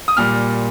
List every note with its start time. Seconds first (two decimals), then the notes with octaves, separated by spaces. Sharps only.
0.08 D#6
0.17 A#2 G3 F6